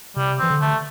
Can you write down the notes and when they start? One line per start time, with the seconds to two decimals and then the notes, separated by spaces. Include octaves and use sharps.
0.16 C3 G3
0.39 E3 C4
0.50 D3
0.61 A3